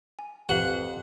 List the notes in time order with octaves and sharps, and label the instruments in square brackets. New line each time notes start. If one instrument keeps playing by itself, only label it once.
[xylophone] G#5
[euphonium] F2 [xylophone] G4 B4 F5 [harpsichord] F#5